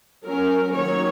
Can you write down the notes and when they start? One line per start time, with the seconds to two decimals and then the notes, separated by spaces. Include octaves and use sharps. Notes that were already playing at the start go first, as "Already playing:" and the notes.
0.26 F#3 C#4 A#4
0.74 D#3 F#3 A#3 C#5